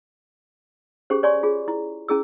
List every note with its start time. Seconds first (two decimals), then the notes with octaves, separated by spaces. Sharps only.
1.10 C#4 G4 G#4 C5
1.23 C#5 D5 G#5 C6 C#6
1.43 F4 G#4
1.68 E4
2.08 C#4 E4 G#4 E6